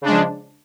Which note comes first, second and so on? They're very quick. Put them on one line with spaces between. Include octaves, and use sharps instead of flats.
C#3 D4 G#3 F3